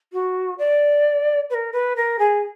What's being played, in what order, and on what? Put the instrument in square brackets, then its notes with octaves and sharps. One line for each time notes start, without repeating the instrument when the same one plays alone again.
[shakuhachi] F#4
D5
B4
A#4
B4
A#4
G#4